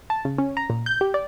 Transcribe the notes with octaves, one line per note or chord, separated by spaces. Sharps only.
A5
C#3
C#4
A#5
A#2
G6
G4
D5